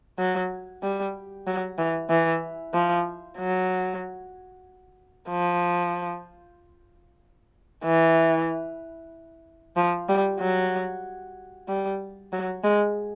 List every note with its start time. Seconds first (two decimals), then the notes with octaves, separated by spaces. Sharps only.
0.19 F#3
0.83 G3
1.47 F#3
1.78 E3
2.10 E3
2.74 F3
3.39 F#3
5.29 F3
7.84 E3
9.77 F3
10.09 G3
10.40 F#3
11.69 G3
12.32 F#3
12.64 G#3